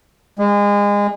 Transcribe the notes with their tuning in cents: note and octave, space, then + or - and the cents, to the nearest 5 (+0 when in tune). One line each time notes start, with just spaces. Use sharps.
G#3 -30